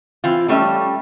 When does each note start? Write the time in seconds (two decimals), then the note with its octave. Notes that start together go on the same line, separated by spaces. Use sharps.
0.24 E3 C4 F4
0.48 G3 A3 C#4 E5